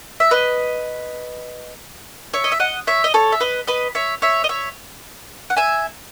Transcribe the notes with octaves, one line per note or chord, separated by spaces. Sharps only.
E5
B4 D#5
C#5 E5
D#5
E5
D#5 F#5
C#5 E5
D#5
A4 C#5
E5
B4 D#5
B4 D#5
C#5 E5
C#5 E5
D#5
C#5 E5
F#5
E5 G#5